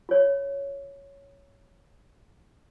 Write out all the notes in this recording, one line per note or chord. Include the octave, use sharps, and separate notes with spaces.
F4 C#5